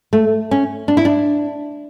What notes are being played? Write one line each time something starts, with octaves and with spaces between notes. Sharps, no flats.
A3
C#4
D4
E4
D4